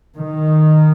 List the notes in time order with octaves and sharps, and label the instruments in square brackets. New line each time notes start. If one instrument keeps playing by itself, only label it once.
[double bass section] D#3